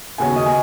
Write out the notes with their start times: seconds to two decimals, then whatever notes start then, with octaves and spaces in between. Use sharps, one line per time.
0.18 D#2 C#3 B3 F#4 C#5 G#5
0.36 D#5
0.46 G#5